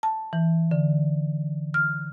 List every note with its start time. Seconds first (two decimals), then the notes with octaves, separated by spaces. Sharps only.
0.03 A5
0.33 E3
0.71 D3
1.74 F6